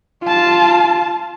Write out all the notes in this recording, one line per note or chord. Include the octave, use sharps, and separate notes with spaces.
F4 A5